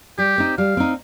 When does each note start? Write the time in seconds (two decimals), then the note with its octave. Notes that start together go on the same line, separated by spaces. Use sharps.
0.18 G3 G4
0.38 C4 D#4
0.58 G3 F5
0.77 C4 D#4